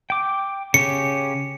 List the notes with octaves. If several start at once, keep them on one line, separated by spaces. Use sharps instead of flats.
G5 D6
C#3 C#4 G4 C#7